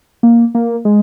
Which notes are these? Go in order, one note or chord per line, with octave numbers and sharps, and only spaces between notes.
A#3
A#3
G#3